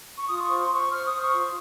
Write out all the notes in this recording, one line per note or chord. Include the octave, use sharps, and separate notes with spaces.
C#6
F4 D#6
C5 C#6
C6
C5 C#6
C5 F6
D#6
C5
C#6
F4